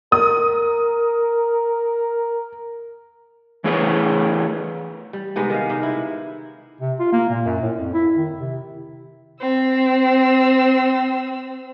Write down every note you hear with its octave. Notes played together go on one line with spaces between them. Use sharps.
A#4 D#6
E3 A3 E4 G#4 B4 C#5
G3
C3 G#3 B3 D#4
D#3 F5
C3 D#4
E4
C3
F4
A#3
A#2
F#2
A2
F2
E4
D#3
C3
C4 E6